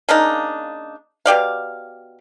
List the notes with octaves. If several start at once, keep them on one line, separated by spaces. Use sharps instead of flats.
C#3 A#3 D4 D#4
B2 G4 D5 F5